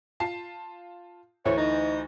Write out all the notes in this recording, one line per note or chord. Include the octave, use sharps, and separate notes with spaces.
F4 A5 C7
D2 E3 A3 C#5
D#4